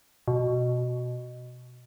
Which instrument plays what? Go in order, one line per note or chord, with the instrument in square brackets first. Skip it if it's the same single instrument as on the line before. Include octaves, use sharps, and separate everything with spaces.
[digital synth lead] B2